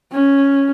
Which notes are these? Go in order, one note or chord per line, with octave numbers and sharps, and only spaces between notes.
C#4